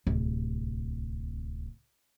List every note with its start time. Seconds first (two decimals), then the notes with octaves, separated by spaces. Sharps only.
0.07 D1 C2